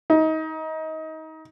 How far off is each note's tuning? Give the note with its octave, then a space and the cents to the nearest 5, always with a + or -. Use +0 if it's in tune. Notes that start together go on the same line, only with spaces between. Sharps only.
D#4 +25